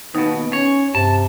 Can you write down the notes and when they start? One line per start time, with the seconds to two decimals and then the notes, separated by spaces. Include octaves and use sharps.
0.15 D#2 B2 B3 D#4
0.53 C#4 C#5
0.95 G2 C3 A5